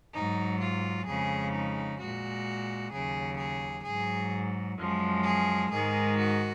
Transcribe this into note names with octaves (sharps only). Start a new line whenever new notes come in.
G#2 F#3 D#4
F4
F2 C#3 G#3 G#4
D#4
A#2 G#3 F#4
D#2 C#3 F#3 G#4
G#4
G#2 F#3 G#4
F#2 F3 G#3
G#4
G#2 D#3 G#3 G#4
F#4